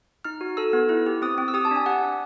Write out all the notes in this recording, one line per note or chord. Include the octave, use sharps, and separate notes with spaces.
D#4 F6
F#4
A4 E6
B3
E4
G4
C4 D#6
C4
E6
G4 D#6
A5
D4 G#5
G4 F#5
D4